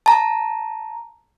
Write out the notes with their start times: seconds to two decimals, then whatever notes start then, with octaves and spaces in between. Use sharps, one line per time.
0.06 A5 A#5